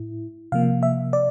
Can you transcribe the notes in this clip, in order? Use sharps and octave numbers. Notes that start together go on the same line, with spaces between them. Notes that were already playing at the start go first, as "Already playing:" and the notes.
Already playing: A2 E4
C3 F3 A#3 F5
E5
D5